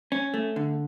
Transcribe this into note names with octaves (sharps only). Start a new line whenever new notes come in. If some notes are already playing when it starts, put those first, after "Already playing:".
C#4
A3
D3